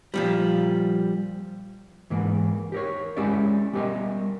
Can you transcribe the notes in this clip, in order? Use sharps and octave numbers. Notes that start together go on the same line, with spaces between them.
A#2 F3 G3
G#2 E3 A#3 B3
G4 A#4 C#5
G#3 C#4 E4 G4 D5 E5
G3 B3 G4 A#4 D#5